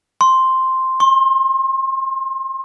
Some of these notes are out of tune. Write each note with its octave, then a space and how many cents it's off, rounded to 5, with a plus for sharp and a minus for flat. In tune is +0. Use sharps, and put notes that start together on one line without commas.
C6 +0
C6 +35